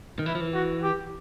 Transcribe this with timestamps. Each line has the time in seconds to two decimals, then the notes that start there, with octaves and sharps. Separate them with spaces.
0.19 D#3
0.26 E3 E4
0.35 F3
0.41 E3
0.54 F#4
0.83 G4